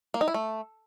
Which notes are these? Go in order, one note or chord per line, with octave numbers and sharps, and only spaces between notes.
A#3
D#4
E4
A3